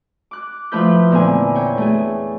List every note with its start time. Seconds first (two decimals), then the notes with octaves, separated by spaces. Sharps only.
0.31 D6 F#6
0.72 F3 A3 E4 B4 G6
1.11 E2 A#2 D3 B3 C4 G#5
1.55 C#5 G5
1.78 A3 G#4